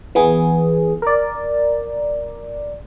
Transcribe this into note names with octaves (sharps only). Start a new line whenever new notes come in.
E3 B3 G#4
A#4 D5